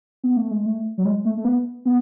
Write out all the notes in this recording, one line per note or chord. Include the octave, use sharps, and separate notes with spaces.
B3
A3
G#3
A3
F#3
G#3
A3
A3
B3
B3